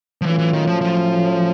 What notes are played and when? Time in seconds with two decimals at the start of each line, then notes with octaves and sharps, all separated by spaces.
0.21 F3
0.26 A2 E3 F#3 A3 C#4 F4
0.39 E3
0.53 D#3
0.67 F3
0.81 F3